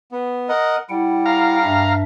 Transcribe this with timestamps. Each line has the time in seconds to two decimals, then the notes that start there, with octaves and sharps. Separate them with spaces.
0.12 B3
0.49 A#4 D#5 F#5
0.90 G3 E4 F#5 G5
1.26 F5 A#5
1.64 G2 D4 E5